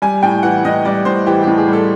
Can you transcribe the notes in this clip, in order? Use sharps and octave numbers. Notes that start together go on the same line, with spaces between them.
G3 G#5
A2 G5
E3 F#5
A2 D#5
G3 D5
A2 C5
E3 G4
A2 G4
G#4
G3
A4